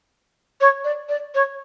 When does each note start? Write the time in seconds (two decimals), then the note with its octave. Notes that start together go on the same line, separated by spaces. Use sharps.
0.61 C#5
0.84 D5
1.09 D5
1.35 C#5